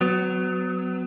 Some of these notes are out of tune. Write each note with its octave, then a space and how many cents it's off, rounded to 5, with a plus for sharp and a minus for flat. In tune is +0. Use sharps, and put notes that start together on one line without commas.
F#3 +0 B3 +30